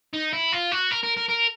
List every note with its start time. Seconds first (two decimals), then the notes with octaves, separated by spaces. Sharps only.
0.14 D#4
0.33 E4
0.52 F4
0.72 F#4
0.91 A#4
1.04 A#4
1.17 A#4
1.29 A#4